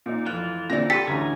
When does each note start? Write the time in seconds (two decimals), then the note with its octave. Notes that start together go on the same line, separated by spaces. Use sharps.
0.06 A#2 D#4
0.26 F1 F2 E3 F4 F#6
0.70 A#2 D3 C4 D5 A#6
0.90 G4 A4 B4 C6 E6 B6
1.07 A1 D2 G#5 A#5